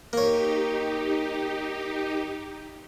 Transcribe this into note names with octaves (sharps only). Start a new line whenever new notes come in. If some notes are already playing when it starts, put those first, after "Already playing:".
A#3 D#4 G4 C#5